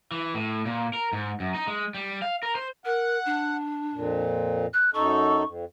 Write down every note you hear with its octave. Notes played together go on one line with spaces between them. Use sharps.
E3
A2
A#2
A#4
G#2
F#2
D#4
G#3
G3
F5
A#4
C5
A#4 F#5
D4
F2 A#2
F#6
F#2 D#4 A4 C#6
F2